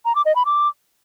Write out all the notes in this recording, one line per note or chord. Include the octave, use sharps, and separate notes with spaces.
A#5
D6
D#5
B5
D6